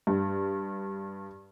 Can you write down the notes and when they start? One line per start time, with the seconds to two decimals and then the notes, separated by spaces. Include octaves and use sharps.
0.07 G2